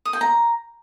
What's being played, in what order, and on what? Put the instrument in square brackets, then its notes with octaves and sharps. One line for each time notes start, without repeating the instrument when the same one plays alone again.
[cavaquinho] D#6
G5
A#5